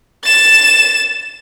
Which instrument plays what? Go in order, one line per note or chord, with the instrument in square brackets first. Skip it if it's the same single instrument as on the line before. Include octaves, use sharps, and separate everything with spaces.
[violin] A6 E7